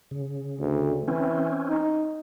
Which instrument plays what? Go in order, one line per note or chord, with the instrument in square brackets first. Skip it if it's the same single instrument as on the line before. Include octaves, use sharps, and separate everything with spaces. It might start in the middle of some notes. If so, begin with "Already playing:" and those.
[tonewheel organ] C#3
[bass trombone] D2
[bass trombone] E3 [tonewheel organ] C4 C#4
[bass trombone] D#4